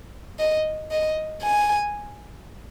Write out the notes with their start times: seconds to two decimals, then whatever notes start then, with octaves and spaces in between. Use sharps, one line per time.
0.39 D#5
0.91 D#5
1.43 G#5